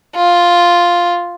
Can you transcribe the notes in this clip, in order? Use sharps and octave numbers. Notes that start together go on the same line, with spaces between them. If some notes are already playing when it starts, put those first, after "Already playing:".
F4